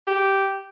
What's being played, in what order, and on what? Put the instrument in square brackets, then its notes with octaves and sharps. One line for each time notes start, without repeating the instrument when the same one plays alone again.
[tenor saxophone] G4